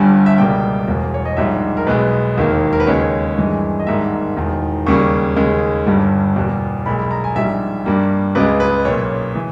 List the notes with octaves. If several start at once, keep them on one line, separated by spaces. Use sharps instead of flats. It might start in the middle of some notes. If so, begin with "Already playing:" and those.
Already playing: G1 G2 G3 G#5
E5
C#2 B2 G3 A#3 G5
E1 E2 B2 A#3
C#5
D#5
A#1 G#2 G3 E5
A#4
B1 B2 G#3 B4
E1 D#2 D#3 A#3
A#4
B4
D#2 C#3 G#3 C#5
G2 E3 G#3
D#5
G#1 G#2 G3 A#3 E5
E1 E2 D#3
D#2 C#3 G3 A#3 C#6
D#2 C#3 G#3
G1 G2 G3
E2 B2 G3 A#3
B1 A#2 G#3 B5
B5
A#5
G#5
A#1 G#2 G3 E5
G2 G3 A#3
C#2 C#3 G#3 B4
B4
B1 A#2 A#3 C#5
E3